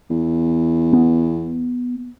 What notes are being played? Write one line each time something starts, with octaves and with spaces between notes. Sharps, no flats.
E2
B3